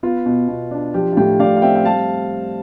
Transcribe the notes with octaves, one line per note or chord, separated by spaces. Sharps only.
B3 F4
B2
B2
D4
F3 G4
F4
A2 G4
A2 D5 F5
F5
C4 E5 G5
G5
G3 F5 A5